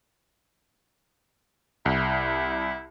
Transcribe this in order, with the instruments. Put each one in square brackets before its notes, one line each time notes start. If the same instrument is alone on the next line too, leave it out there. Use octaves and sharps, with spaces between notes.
[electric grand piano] C2 [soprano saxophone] E4